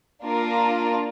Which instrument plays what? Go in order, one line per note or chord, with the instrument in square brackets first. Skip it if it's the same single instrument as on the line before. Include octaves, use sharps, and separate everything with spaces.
[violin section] A#3 D4 F4 A#4